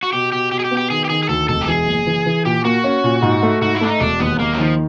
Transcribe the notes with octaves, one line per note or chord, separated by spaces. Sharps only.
F#4
B2 G4
B2 G4
B2 G4
G#4
G4
B3
G4
D#3 G#4
G4
D#3 G#4
G#4
D2 A4
E1 A4
G4
E3 G#4
F#1
E3
E3
A#2 G4
A#3 F#4
C#4
A#2
G#2
A3
G#2 F#4
E4
A3 D4
D#4
E1 D4
D#2 B3
D#2 A#3
F#3
D#3 F3